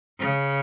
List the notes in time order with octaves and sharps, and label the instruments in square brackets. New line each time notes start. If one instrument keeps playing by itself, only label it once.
[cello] C#3